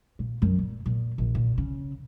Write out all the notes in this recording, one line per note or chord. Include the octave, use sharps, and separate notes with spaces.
A#2
F#2
A#2
A#2
A#1
A#2
C#3